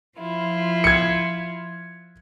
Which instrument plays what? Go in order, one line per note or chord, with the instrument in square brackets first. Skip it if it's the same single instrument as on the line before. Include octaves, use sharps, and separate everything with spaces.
[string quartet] F3 E4 F4
[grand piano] G#6 C#7